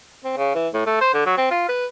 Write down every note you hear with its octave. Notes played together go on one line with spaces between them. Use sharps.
C4
C#3
E3
A2
A3
C5
D3
F#3
C4
F4
B4